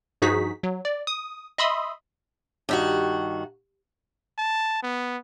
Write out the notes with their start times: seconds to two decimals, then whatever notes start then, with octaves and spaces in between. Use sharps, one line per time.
0.22 G2 F3 D#4 F#4 G#4 B6
0.63 F#3
0.85 D5
1.07 D#6
1.58 D#5 E5 B5 C6 D#6 E6
2.69 G2 D#3 F#4
4.38 A5
4.83 B3